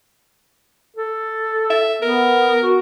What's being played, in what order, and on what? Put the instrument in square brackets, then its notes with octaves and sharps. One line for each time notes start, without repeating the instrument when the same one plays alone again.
[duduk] A4
[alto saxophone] E5
[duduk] B3 [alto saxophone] A#4
[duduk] F#4